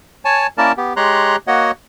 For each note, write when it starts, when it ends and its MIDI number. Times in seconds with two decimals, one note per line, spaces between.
0.25 0.47 73
0.25 0.47 80
0.25 0.47 81
0.58 0.72 58
0.58 0.72 61
0.58 0.72 64
0.58 0.72 70
0.58 0.72 74
0.58 0.72 81
0.77 0.94 59
0.77 0.94 67
0.96 1.36 56
0.96 1.36 67
0.96 1.36 73
0.96 1.36 82
0.96 1.36 84
0.96 1.36 90
1.47 1.71 58
1.47 1.71 66
1.47 1.71 73
1.47 1.71 75
1.47 1.71 78